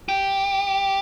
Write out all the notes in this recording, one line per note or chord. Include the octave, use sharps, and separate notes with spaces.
G4